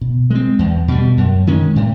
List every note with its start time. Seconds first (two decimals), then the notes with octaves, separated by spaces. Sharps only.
0.01 B2
0.30 G#3 C4
0.59 E2
0.88 B2 G3
1.17 F#2
1.47 D#3 G#3 C#4
1.76 A2